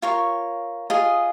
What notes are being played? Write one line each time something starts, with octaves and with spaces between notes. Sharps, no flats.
F4 A#4 C#5 C#6
F4 G#4 D#5